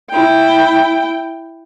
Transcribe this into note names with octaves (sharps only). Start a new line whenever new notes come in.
E4 G5